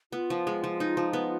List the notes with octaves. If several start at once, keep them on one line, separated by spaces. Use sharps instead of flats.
B3 F4
F3
G#3
F3
D#4
F3
B3